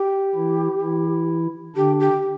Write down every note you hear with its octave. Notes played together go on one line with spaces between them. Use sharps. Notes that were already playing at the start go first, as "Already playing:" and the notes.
Already playing: G4
E3 E4
E3 E4
D3 D4 G4
G4